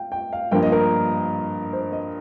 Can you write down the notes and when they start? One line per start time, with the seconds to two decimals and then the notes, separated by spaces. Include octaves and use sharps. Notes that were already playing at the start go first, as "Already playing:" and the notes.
Already playing: F5 G5
0.12 G5
0.33 F5
0.51 G2 F3 A#3 G5
0.63 D#5
0.72 A#4
1.73 C5
1.92 D#5